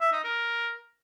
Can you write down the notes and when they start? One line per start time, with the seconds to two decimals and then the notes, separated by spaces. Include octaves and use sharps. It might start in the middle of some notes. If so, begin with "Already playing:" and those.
0.01 E5
0.12 D#4
0.24 A#4